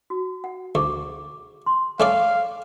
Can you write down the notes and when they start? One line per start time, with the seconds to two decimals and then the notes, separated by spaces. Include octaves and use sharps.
0.10 F#4
0.44 F#5
0.75 D2 G#4 C#6 D6
1.66 C6
2.00 A3 C#4 D5 F5 G#5